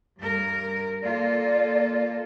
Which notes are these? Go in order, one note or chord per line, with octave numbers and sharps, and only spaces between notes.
G2 A#4
A#3 F4 A4 D5